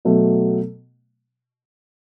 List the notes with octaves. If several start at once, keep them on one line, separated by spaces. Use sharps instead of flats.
B2 F#3 A3